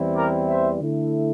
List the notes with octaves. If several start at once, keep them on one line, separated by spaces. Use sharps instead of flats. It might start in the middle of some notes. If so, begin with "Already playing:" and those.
Already playing: E2 E3 G3 C4 E4
A#4 D5
C5 E5
D3 A3 E4